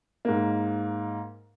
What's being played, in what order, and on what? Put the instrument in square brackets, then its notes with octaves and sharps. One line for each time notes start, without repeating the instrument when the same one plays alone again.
[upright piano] G#2 A#3